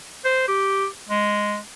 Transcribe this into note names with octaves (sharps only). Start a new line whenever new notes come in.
C5
G4
G#3